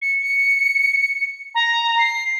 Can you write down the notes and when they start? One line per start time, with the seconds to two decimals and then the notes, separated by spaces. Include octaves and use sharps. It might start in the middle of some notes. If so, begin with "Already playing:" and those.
0.01 C#7
0.22 C#7
1.54 A#5
1.98 C7